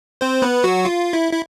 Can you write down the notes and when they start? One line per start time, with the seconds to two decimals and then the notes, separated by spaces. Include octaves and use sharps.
0.21 C4 C5
0.42 B3 B4
0.64 F#3 F#4
0.85 F4
1.13 E4
1.33 E4